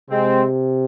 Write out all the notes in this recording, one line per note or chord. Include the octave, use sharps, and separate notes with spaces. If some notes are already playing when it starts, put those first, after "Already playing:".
C3 G#3 C4